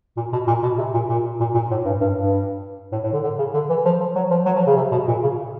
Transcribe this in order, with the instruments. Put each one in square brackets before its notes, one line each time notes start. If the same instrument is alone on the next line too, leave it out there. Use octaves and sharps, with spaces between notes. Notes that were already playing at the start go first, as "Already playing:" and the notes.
[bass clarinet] A#2
B2
A#2
B2
C3
A#2
A#2
A#2
A#2
A2
G2
G2
G2
A2
A2
D3
D3
C#3
D3
E3
F3
F3
F#3
F3
F#3
F3
C#3
C3
B2
A#2
C#3